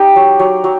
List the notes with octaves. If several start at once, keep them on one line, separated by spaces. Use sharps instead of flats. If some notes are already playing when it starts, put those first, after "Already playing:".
Already playing: D#4 G4
F#3
F#3
F#3